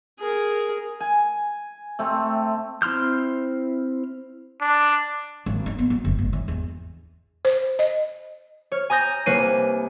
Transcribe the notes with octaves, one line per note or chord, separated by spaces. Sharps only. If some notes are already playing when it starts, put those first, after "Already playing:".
G#4 A#4
G#5
C3 A3 C4
C4 E4 C6 F6 G6
D4
G#1
D#4
B3
F#3
F#1
G#1
E3
E2
C5
D#5
C#5 F6
G#5 A#5 D#6 G6 A#6
C2 A#3 B4 C#5 C7 D#7